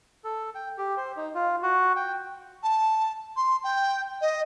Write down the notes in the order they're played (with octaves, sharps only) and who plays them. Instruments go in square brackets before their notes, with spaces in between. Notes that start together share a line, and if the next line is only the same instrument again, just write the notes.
[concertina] A4
G5
G4
C5
D#4
F4
F#4
G5
[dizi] A5
C6
G5
D#5